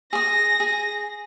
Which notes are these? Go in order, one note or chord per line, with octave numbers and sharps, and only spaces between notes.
G#4 D#6 A#6
G#4